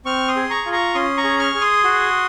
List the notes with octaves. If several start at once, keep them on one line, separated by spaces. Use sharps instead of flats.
C4 C#6 F6
C6 D#6
G#4
A#5 C#6
F4
A#5 C#6
C#4 C6 D#6
A#5 C#6
G#4
C#6 F6
G#4
C6 D#6
F#4